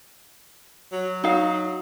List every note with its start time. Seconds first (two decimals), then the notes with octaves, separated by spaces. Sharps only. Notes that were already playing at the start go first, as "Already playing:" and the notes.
0.92 F#3
1.24 F#3 D#4 F5